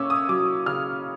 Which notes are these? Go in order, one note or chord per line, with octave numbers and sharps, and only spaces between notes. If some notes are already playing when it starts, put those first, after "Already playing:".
Already playing: A#3 C#4 C#6 D6 E6
D#6
F#3 D6
C#3 F6